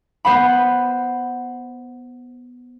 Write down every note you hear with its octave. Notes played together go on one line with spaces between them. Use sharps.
B3 C5 F#5 B5